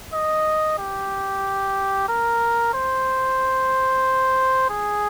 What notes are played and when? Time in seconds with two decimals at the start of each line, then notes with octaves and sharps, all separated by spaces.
0.13 D#5
0.78 G4
2.08 A#4
2.74 C5
4.70 G#4